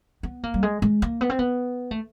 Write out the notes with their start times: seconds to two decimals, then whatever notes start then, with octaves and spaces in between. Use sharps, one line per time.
0.23 B3
0.43 A#3
0.54 G3
0.63 G#3
0.82 G#3
1.02 A#3
1.21 B3
1.30 C4
1.39 B3
1.91 A3